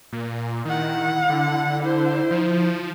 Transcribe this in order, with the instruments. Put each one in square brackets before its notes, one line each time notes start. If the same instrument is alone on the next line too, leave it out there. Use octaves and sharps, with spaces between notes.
[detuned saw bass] A#2
[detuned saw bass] D#3 [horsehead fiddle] E4 F#5
[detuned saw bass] D3
[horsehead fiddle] E4 C5
[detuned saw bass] F3